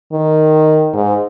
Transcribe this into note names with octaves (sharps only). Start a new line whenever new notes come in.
D#3
G#2